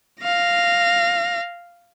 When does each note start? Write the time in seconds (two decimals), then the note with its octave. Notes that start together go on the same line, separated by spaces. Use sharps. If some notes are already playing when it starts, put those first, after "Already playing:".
0.23 F5 A#6